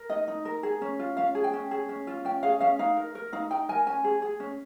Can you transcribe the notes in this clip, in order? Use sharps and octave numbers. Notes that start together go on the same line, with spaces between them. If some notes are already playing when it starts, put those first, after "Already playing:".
Already playing: A#4
D#4 D#5
D#4
A#4
G#4
C#4
F4
C#4 F5
G#4
G5
C#4
G#4
C#4
F4
C#4 G5
G#4 F5
C#4 F5
D#4 F5
A#4
A#4
D#4 F5
D#4 G5
A#4 G#5
C#4 G#5
G#4
G#4
C#4